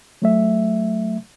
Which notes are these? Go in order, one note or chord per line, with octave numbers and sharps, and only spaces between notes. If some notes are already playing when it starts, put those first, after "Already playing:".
F#3 A3 E5